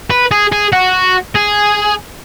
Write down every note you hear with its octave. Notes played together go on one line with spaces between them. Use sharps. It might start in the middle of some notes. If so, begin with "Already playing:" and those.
B4
G#4
G#4
F#4
G#4